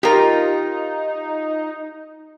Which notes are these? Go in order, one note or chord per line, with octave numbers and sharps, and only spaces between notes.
D#4 F4 G4 A#4 A#5